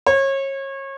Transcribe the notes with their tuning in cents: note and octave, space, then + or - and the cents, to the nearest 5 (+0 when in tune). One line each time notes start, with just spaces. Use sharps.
C#5 -30